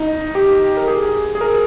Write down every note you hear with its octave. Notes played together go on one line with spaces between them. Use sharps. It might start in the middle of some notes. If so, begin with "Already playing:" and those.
Already playing: D#4
G4
A#4
G#4
G#4
A#4